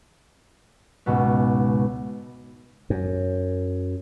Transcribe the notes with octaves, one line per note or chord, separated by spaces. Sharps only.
C#2 G#2 B2 B3
F#2